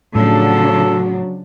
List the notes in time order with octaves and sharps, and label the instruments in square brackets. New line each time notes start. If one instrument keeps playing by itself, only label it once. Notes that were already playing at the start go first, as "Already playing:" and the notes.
[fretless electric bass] A2 [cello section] C#3 F3 D4 [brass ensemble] F#3 [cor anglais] A4